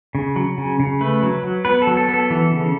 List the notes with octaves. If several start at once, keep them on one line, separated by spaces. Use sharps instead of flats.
C#3
F#3
C#3
C#3
A3 B4
F#3
F#3
B3 B4
A4
F#3
A4
B3
A4
E3
C#3